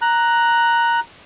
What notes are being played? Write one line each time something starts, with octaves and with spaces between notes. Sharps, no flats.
A#5 F#6